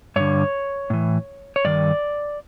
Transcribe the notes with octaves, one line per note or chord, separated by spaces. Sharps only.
G2 D3 C#5
A2 E3
C#5
G2 D#3 D5